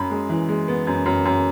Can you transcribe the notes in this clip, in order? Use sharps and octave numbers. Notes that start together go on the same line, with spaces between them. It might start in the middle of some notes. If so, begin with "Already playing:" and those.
Already playing: F#2 B5
G#3
E3
G#3
B3
F#2
F#2
F#2